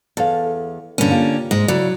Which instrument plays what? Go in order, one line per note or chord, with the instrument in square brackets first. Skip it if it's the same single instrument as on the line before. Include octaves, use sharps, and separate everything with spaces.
[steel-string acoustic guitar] E2 [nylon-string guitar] A4 F5
[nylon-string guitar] G2 A#2 [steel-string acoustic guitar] D3 C#4
[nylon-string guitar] A#3 F4 G4
[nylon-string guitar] G#2 [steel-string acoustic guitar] G#3
[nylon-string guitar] C#3 E4 D5 [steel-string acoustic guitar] F#3